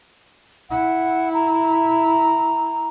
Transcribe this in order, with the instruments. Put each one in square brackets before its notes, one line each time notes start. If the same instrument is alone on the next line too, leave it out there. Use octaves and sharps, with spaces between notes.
[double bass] E4 [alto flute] F#5
[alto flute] A#5